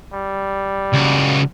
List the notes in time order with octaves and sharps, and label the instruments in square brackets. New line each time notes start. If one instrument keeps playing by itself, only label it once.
[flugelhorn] G3
[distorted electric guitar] C#2 F#4